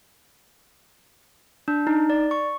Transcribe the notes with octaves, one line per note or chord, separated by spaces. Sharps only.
D4
D#4
D5
C#6